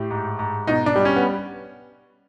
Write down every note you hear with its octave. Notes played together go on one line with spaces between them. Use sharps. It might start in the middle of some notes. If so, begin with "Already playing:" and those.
Already playing: A2 G4
G#2
G#2
B2 D#4
D4
G3
C#4
B3